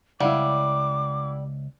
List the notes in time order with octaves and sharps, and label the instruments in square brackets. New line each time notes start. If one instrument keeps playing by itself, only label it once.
[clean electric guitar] C#2 [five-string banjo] G3 [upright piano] E4 F5 F#5 [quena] D6